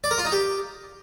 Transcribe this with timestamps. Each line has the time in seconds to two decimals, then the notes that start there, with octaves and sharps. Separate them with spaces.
0.04 D5
0.11 A#4
0.18 F4
0.25 D#4
0.32 G4